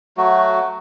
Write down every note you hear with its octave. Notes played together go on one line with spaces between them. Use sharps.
F#3 A3 F#4